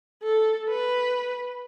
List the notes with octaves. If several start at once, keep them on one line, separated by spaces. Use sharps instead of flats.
A4
B4